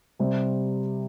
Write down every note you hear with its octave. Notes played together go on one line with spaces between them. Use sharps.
C3 G3 C4 G4 C5